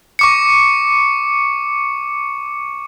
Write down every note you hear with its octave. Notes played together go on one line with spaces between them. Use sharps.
C#6 D6 C#7